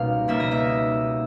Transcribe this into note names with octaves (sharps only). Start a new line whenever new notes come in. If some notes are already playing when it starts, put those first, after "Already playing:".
Already playing: C#2 B2 G3 A#3 D#4 F5
C#2 B2 G3 A#3 D#4 E5
D#5
E5